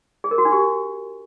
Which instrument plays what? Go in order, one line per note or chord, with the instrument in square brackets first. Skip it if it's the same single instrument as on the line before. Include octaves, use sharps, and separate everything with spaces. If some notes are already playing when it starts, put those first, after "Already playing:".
[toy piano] G#4
A#4
F#4
D4
G4